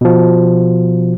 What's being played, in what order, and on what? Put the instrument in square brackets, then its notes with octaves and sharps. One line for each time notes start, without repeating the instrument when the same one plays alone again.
[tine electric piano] B2 F3